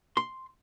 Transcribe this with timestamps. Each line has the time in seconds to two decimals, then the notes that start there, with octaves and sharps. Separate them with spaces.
0.17 C6